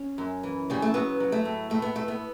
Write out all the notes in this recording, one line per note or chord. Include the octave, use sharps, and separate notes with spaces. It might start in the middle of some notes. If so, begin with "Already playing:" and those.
Already playing: C#4
F#2
E3
C#3 G3
A3
F#3 B3
F#3
A3
A2
A2 A3
B3
A2 A3
B3